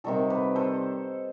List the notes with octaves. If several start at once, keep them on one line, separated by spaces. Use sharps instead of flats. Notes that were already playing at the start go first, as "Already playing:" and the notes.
C3 D#3 G3 F#4 A4
G4 B4
A4 C5